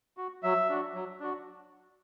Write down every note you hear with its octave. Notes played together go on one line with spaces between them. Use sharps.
F#4
F#3 E5
D4 F#4
F#3
D4 F#4